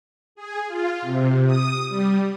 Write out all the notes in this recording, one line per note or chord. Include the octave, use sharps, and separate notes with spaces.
G#4
F4
C3
D#6
G3